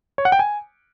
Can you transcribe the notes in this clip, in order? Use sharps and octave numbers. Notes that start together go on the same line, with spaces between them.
C#5
F#5
G5
G#5